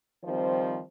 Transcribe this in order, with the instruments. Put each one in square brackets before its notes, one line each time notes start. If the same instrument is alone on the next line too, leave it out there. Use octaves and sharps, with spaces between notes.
[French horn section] D#3 F3 G3 C4 C5